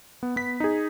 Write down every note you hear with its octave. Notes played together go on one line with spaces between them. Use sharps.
B3
B3 B6
D#4 G#4